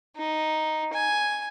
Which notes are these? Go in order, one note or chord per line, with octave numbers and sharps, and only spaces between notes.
D#4
G#5